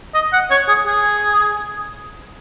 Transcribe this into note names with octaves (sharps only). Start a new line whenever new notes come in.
D#5
F#5
C#5
G#4
G#4